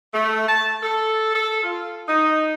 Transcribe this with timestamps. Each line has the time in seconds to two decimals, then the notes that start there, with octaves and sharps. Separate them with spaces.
0.14 A3
0.48 A5
0.81 A4
1.34 A4
1.63 F4
2.07 D#4